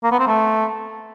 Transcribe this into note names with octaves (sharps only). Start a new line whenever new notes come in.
A#3
B3
C4
A3